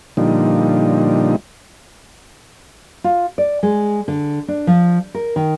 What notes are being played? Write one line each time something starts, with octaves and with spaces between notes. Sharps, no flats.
A#2 D3 F3 G3 D#4
F4
D5
G#3
D3
D4
F3
A#4
D#3